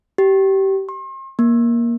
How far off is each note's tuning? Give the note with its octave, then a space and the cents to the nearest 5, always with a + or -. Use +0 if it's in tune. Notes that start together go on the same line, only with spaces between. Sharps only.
G4 -20
C6 +40
A#3 +15